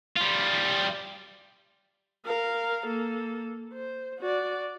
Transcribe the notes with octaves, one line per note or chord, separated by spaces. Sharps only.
G3 F4
A#4 F5
A#3 A4
C5
F#4 D5